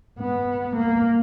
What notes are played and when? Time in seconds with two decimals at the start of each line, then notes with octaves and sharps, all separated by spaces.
0.20 B3
0.76 A#3